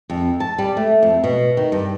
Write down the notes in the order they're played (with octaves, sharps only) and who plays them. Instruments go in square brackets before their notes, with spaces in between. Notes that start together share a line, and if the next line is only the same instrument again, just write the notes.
[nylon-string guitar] F2
A5
G3
A3
F2
B2
D#3
G2